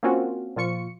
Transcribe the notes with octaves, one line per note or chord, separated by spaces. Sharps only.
A#3 C4 C#4 F4 F#4
A#2 F3 F4 C#6 C#7